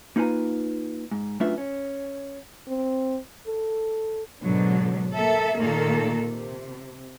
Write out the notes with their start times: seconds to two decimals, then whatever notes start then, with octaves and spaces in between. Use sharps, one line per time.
0.16 A#3 D#4 F4 B4 G#5 A#5
1.11 G#2
1.40 F#2 A3 D4 F4 B4 E5
1.58 C#4
2.69 C4
3.48 A4
4.42 G#2 B2 D3 F#3
5.14 A#3 A4 E5
5.59 A#2 D#3 A#3 A4
6.26 C3